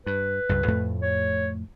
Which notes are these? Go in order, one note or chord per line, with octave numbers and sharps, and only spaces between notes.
G2 B4
C#2 G2
F2 A2 A3
C#5